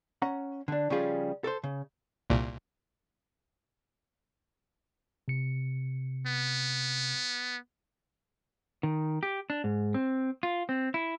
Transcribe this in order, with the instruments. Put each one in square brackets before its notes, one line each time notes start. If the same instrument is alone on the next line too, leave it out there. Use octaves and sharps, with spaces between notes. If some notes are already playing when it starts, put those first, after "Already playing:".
[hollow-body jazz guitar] C#4 F#5 A#5
D3 D4
C#3 F3 G3 C#4 F4 G#4
A4 A#4 C5
C#3
[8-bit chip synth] C2 A#2
[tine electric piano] C3 C#7
[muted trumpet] B3
[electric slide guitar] D#3
G4
D4
G#2
C4
F4
C4
E4